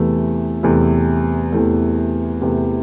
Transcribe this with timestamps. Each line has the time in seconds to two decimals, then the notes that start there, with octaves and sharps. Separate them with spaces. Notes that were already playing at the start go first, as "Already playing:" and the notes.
Already playing: E2 C3 E3 A3
0.63 E2 C3 E3 A3
1.52 E2 C3 E3 A3
2.41 E2 C3 E3 A3